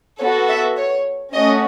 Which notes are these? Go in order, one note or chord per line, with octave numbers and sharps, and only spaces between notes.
B3 F#4 A4 C#5
E5
C#5
A3 C#4 F#4 D#5